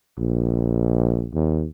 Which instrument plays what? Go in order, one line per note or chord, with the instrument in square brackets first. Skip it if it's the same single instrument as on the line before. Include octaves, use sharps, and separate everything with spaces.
[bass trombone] A#1
D#2